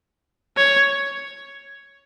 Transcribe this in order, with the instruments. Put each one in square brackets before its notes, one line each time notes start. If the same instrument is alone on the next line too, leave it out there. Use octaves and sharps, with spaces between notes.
[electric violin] C#5